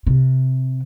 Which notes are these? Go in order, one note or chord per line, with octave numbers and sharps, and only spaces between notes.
C3